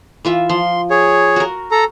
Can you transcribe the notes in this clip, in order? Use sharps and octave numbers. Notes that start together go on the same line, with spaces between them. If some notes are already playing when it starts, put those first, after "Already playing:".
E3 F4 E5
F3 C6
G#4 C#5
F#4 A#4
A4 A#5